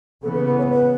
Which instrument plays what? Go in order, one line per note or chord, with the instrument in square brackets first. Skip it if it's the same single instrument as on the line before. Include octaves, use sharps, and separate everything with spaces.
[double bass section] C#3 E3 B3 [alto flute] A4
[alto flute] B4
B4
C#5
B4